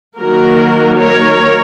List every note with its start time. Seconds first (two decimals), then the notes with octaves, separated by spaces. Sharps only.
0.18 D#3 F#3 A#3 F#4 A#4
0.99 A#4 C#5